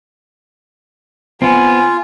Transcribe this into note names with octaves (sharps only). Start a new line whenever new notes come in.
B3 C4 F4 G#5